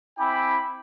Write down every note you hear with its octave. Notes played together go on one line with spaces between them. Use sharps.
C4 E4 G5 G#5 B5 D6